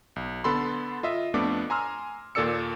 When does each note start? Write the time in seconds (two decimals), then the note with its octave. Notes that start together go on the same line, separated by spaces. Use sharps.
0.16 B1
0.44 D3 B3 A4 B5 C6
1.03 F4 D#5 E5
1.34 F2 A3 B3 D4 D6
1.70 G#5 A#5 C6 E6 F6
2.35 D#2 A#2 A4 D5 E6 C#7